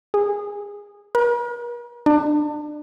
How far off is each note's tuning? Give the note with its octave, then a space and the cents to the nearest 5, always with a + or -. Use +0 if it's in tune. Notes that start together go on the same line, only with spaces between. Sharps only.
G#4 -20
A#4 +45
D4 +30